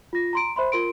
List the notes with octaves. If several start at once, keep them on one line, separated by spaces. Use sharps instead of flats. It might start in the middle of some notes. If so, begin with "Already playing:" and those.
F4 A#6
A#5 C6 D7
C5 E5 B5 C6
F4 A#4 C6 D7